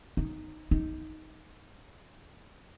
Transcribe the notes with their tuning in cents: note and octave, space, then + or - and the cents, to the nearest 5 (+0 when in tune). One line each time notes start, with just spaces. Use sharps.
D#4 -5
D#4 +10